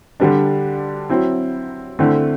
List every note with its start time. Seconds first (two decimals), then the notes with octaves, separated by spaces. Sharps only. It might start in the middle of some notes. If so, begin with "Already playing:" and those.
0.20 D3 G3 D4
1.10 F#3 C4 E4
1.99 D3 A3 C4 E4